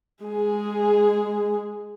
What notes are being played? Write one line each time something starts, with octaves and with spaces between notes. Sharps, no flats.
G#3 G#4